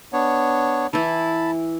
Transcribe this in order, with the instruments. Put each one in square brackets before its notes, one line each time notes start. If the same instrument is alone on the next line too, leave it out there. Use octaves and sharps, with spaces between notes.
[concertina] B3 D4 C#5
[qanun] E3 E4 [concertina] A5 B5